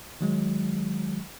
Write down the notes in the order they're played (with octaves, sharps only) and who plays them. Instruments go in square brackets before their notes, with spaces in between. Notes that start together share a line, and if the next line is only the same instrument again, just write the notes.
[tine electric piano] D#3 F#3 G#3